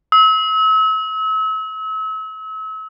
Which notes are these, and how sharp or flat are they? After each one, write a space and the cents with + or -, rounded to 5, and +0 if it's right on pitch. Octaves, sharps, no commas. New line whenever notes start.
E6 -40